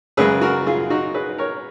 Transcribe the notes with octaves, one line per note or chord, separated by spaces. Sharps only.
F#2 C#3 G#3 G#4 B4
F#4 A#4
F4 G#4
D#4 F#4
G#4 B4
A#4 C#5